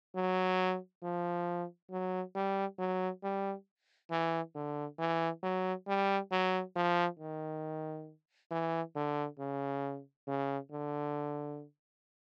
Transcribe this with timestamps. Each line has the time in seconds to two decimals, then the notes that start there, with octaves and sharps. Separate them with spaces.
0.15 F#3
1.03 F3
1.91 F#3
2.35 G3
2.79 F#3
3.23 G3
4.11 E3
4.55 D3
4.99 E3
5.43 F#3
5.87 G3
6.31 F#3
6.76 F3
7.19 D#3
8.51 E3
8.96 D3
9.39 C#3
10.27 C#3
10.71 D3